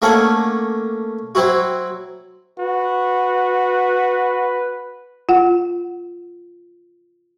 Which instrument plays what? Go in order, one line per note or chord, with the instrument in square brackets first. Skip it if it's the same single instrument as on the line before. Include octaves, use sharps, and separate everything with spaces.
[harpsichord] A3 A#3 C#4 D4 F#5
F#3 C4 E4 F#4
[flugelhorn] F#4 [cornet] B4
[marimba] F4 F#5